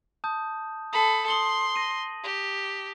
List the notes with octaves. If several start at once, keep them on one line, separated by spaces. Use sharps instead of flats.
A5 D#6 G6
A4 A5 B5 D#6
C6 D#6 F#7 G7
A#6 D#7
G4